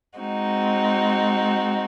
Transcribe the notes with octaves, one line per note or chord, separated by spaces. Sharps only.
G#3 C4 D#4 F#4